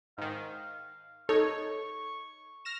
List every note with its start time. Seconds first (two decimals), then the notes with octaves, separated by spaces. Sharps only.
0.18 G#2 D#3 F5
1.29 D#4 A4 C#5 C#6
2.65 F6 A#6 E7